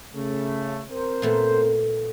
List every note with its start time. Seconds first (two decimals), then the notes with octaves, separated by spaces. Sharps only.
0.15 C#3 A3
0.90 C4 A#4 C5
1.22 A#2 A3 B3